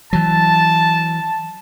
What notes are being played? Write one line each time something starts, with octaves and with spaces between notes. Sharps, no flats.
E3 F#3 A5